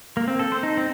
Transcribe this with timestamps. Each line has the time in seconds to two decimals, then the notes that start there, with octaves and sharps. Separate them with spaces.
0.17 A#3
0.28 C4
0.39 A4
0.52 C5
0.63 D#4
0.77 C4